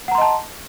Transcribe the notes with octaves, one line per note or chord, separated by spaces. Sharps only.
D#5 F#5 A5 A#5 C6